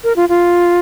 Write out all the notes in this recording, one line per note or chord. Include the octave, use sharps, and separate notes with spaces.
A#4
F4
F4